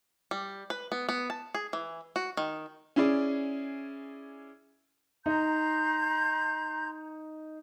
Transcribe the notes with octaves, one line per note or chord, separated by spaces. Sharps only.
G3
B4
B3
B3
A5
G#4
E3
F#4
D#3
C#4 E4 G#4 D5
D#4 A#5 C6 G6